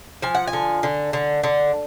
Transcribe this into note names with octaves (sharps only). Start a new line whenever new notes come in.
F3 G#5
F#5
G#5
D3
D3
D3
D3